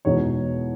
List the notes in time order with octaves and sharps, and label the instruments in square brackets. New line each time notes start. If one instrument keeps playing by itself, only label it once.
[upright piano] E2 B2 G#3 D#4 C#5